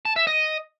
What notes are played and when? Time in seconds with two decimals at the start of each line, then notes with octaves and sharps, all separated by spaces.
0.05 A5
0.16 E5
0.27 D#5